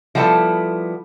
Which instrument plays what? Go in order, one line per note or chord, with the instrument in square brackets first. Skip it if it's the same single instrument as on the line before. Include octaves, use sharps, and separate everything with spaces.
[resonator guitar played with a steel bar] F3 G3 B3 E4 A4 A5